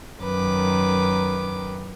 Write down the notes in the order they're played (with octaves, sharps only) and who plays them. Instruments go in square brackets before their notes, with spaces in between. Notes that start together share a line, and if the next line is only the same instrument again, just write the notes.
[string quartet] F#2 D#3 B4 D6